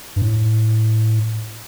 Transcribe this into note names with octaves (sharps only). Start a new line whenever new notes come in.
G2
A2